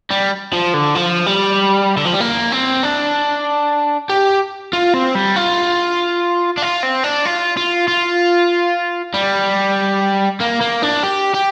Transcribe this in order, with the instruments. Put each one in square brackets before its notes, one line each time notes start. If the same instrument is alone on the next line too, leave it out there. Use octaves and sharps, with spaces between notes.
[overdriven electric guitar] G3
F3
D3
F3
G3
D3
F3
G3
A#3
C4
D4
G4
F4
C4
G3
F4
D4
F4
C4
D4
F4
F4
F4
G3
A#3
A#3
D4
G4
G4